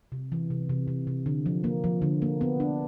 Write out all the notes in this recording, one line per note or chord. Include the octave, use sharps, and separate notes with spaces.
C3
E3
C3
C3
C3
C3
D3
F3
A#3
F3
D3
A#3
B3
D4